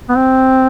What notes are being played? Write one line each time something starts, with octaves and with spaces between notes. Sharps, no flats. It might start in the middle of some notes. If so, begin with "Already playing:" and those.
B3
C4